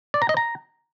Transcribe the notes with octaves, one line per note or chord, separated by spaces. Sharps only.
D5
A#5
D#5
A#5